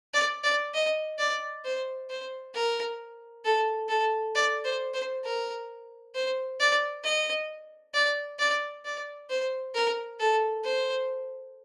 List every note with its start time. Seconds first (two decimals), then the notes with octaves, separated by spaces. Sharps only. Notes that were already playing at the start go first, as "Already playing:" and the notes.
0.14 D5
0.44 D5
0.74 D#5
1.19 D5
1.65 C5
2.10 C5
2.54 A#4
3.45 A4
3.89 A4
4.35 D5
4.64 C5
4.94 C5
5.25 A#4
6.15 C5
6.60 D5
7.04 D#5
7.94 D5
8.39 D5
8.85 D5
9.30 C5
9.75 A#4
10.20 A4
10.65 C5